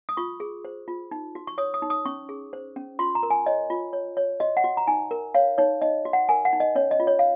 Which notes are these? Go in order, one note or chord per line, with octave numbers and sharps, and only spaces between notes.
D#6
F4 C#6
G#4
C5
F4
D#4
F#4
C#6
C#5 D#6
D#6
D#4
D#6
C#4 C#6
G#4
C5
C#4
F4 C6
A#5
A#4
G#5
C#5 D#5
F4
C#5
C#5
F#4 D#5
F#5
F#4
A#5
D#4 G#5
A#4
C#5 F5
D#4 C#5
D#4 D#5
F#4
F#5
A#4 G#5
F#5
D#4
D#5
C#4 C#5
D#5
F4
C#5
F5